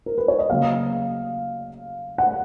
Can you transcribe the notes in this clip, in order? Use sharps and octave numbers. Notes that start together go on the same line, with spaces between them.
A#4
B4
C#5
D#5
C#3 F#3 A#3 F5
F#5